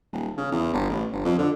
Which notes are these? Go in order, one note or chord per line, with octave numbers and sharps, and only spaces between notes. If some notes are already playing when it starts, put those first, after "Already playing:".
D#1
C#3
E2
G1
A1
G1
F2
D3